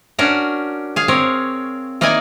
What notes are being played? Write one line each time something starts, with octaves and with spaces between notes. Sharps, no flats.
C#4 D4 F#4 A#4
G#4 F5
C4 A#4 C#5
A#3 D#4 E4 D5 G#5